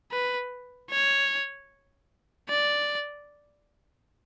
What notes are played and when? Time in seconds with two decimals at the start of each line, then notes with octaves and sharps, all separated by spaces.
0.12 B4
0.90 C#5
2.49 D5